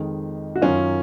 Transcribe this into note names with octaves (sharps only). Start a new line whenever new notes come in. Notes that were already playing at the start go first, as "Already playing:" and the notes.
Already playing: F2 D#3 G#3
F#4
F#2 D#3 F#3 C#4 F4